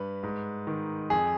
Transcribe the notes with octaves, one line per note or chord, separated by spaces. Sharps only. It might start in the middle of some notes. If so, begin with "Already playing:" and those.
Already playing: G2 B4
G#2
D#3
F2 G#4